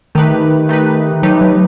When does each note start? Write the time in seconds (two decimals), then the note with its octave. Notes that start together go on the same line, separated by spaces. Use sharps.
0.15 D#3 A3 D#4 G4 B4
0.69 A3 D#4 G4 B4
1.23 F#3 A3 D#4 G4 B4
1.41 F#3